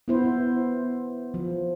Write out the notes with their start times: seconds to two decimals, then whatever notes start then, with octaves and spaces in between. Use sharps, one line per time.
0.08 B3 E4 C5
1.34 F3